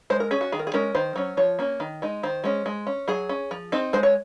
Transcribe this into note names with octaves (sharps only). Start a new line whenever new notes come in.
G#3 C5
A#4
C#4 G#4
F#4
D#3 G#4
A#4
G#4
G#3 C#4 A#4
D#3 C5
F#3 C#4
F3 C#5
A#3 C#4
D#3
G#3 D#4
D#3 C5
G#3 C#4
G#3
C#4
F#3 G#4
C#4
F3
C4 D#4
G#3 C5
C#5